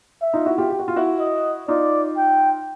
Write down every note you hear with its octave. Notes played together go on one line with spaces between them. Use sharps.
E5
D#4 F4
E4 F#4
F4 G4
G4
F#4
F4
E4 F#4
D#5
D#4 F4 D5
G5